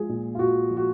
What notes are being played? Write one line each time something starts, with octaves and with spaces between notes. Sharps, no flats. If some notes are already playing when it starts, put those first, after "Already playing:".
Already playing: F3 G#3 G#4
A#2
F4
A#2 F#4
F3
F#4